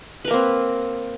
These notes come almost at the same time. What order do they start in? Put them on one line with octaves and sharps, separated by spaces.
B4 A#4 A#3 C4